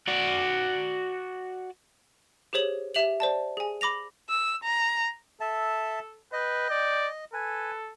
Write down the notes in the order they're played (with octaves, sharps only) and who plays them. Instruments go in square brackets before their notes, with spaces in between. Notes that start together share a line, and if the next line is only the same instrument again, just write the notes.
[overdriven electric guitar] F#4 D5
[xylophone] G4 G#4 C5 C#5 F#7
G4 E5 F7 F#7
C5 D5 A5
G#4 G#5
B5 D6 A#6 F7
[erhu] E6
A#5
[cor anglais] A4 [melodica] E5 A5
[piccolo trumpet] B4 [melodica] D#5 [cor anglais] G5
[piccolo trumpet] D5
[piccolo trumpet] A4 [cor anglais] B4 [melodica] G#5